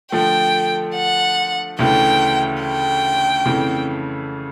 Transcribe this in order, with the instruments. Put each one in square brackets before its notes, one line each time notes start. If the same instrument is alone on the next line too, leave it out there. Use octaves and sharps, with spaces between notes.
[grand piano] D3 F3 A3 [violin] G5
[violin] F#5
[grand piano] D2 C#3 E3 A3 [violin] G5
[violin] G5
[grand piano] F2 C#3 E3 A3